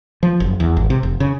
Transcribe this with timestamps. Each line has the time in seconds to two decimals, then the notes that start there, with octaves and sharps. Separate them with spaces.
0.23 F3
0.40 F#1
0.60 E2
0.77 G#1
0.90 C3
1.03 F1
1.20 C#3